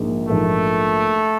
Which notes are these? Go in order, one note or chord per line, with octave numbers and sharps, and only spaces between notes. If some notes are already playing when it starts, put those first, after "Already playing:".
Already playing: A#1 G#2 F3 A#3
A#1 G#2 F3 A3 A#3